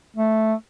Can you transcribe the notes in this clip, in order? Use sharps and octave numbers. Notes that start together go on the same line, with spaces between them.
A3